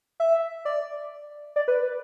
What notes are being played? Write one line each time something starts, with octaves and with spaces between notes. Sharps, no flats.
E5
D5
D5
B4